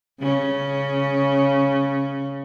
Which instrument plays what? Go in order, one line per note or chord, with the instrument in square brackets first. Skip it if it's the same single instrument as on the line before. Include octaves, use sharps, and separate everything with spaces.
[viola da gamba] C#3 C#4